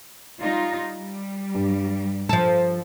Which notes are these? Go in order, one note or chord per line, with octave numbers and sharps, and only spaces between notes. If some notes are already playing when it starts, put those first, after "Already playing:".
G3 D#4 F4
G3
G2
F3 A4